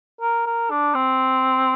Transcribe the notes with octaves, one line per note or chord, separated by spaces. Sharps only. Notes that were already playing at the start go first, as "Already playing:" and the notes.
A#4
A#4
D4
C4